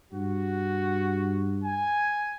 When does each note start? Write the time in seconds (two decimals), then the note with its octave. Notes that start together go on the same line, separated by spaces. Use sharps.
0.12 G2 F#4
1.64 G#5